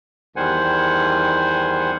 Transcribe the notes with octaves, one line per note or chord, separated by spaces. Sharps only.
E2 D#3 G3 C5 F#5 G#5